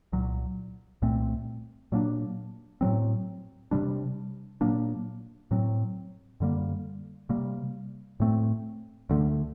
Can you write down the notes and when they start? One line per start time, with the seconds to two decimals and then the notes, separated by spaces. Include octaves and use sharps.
0.12 C2 A#2 F#3
1.02 C2 A#2 A3 C4
1.92 A#2 F#3 A#3 D4
2.81 A2 F#3 C4
3.71 C3 G3 D4
4.61 A#2 F#3 A#3 D4
5.51 A2 F#3 C4
6.40 F#2 D3 G3 A#3
7.29 C3 G3 A#3
8.20 A2 A3 C4
9.09 D2 D3 A3